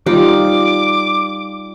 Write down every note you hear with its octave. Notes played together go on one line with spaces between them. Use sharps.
G3 D#4 F4 D6